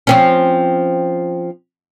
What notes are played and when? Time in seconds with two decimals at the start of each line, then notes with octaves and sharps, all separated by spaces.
0.07 F3 C4 C#4